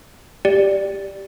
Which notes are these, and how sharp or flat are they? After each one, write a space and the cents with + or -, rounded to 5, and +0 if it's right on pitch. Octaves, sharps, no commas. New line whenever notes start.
G4 +0 D5 +0